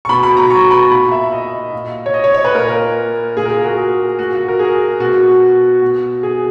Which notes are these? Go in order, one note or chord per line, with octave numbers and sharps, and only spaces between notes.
C#6
B2 B5
B5
A#5
C#6
B5
A#2 B5
E5
D#5
A#2
C#5
D#5
C#5
C#5
B4
A#2 A#4
A#2 G#4
A#4
G#4
F#4
G#4
A#2 F#4
F#4
A#4
G#4
B2 F#4
B2
G#4